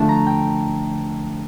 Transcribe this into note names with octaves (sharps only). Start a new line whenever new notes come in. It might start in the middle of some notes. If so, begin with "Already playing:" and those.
Already playing: D3 F3 A3 D4 A5
A#5
G5